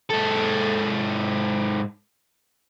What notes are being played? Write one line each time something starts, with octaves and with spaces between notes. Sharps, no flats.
G#2 A4